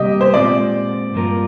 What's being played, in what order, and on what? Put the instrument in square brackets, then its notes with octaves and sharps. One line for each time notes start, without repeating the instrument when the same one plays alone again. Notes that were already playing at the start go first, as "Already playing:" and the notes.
Already playing: [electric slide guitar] C3 G3 A#3 [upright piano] G4 D#5
[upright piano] C5
[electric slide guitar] A#2 G#3 C4 F4 C5 [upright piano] D5
[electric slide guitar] G2 F3 A#3 F4 A#4